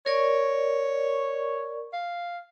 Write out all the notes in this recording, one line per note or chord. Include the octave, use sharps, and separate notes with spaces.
A#4 C#5 D5 C#6
F5